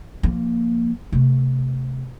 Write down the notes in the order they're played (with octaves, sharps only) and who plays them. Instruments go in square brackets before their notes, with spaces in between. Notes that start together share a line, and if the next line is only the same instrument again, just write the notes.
[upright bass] F3 A#3
C3 A3